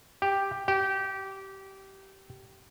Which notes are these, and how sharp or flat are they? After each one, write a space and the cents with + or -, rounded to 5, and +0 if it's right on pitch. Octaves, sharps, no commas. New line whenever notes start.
G4 +5
G4 -20